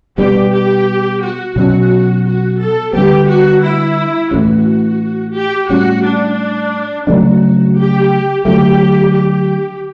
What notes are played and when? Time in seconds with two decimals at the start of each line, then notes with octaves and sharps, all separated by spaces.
0.18 B2 G3 B3 D4 G4
0.53 G4
1.22 F#4
1.56 B2 F#3 C#4 F#4
2.25 F#4
2.59 A4
2.93 D3 G3 B3 G4
3.28 F#4
3.63 E4
4.31 A2 E3 A3 C#4 F#4
5.35 G4
5.69 A2 G3 C#4 F#4
6.04 D4
7.07 C#3 F#3 A3 D4 F#4
7.76 G4
8.45 D3 F#3 A3 G4
9.14 G4